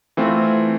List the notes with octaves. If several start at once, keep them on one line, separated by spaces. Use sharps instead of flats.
E3 A3 C4 F4